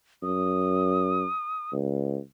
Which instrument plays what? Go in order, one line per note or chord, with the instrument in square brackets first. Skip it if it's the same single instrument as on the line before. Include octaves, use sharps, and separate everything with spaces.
[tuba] F#2 [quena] D#6
[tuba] C#2